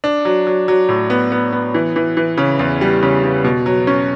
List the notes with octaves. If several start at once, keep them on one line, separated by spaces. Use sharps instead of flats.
D4
F#3
F#3
F#3
A2
B3
B3
B3
E3
E3
E3
C#3
E2
G3
C#3
C#3
B2
F#3
C#4